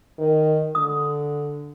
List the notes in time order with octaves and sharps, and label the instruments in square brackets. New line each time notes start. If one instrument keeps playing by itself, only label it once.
[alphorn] D#3
[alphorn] D3 [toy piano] D#6